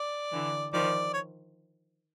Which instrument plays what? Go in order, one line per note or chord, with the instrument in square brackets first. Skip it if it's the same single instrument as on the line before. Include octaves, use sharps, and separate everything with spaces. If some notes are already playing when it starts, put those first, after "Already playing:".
Already playing: [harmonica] D5
[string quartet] D3 E3
[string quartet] D#3 F3 [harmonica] D5
[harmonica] C#5